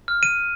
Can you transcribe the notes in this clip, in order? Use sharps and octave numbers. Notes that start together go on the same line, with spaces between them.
F6
D#7